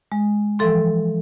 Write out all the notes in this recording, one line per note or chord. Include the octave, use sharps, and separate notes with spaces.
G#3
E3 F3 A4 C6